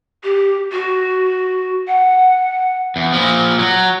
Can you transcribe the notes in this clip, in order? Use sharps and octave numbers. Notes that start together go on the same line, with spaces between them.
G4
F#4
F#5
E2
A#2 F3
F#3